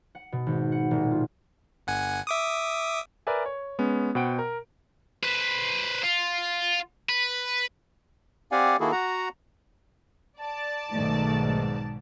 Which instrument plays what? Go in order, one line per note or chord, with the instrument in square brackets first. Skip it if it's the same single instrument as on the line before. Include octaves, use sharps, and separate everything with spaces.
[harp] F#5
B2
G#1
F#5
D#1
F4
[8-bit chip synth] G1 F#5 G#5
E5 D6 D#6
[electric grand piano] A#4 B4 D5 E5 G#5
C#5
G#3 B3 C#4
B2 B4 C5 F#5 G5 D7
A#4
[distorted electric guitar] B4 C5
F4
B4
[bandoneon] C4 G4 D5 F5 F#5 G#5
D#3 A#3 E4 F#4 G#4 A4
F#4 F#5 A#5
[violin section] D5 A5
[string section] B1 G#2 [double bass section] B2 D#3 [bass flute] A3